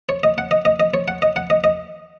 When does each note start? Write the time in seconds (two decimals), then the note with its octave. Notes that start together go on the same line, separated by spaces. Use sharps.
0.09 C#5
0.23 D#5
0.38 F#5
0.51 D#5
0.65 D#5
0.80 D#5
0.94 C#5
1.08 F#5
1.22 D#5
1.36 F#5
1.50 D#5
1.64 D#5